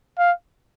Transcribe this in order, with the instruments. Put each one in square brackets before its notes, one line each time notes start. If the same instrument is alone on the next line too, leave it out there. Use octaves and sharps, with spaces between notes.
[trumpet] F5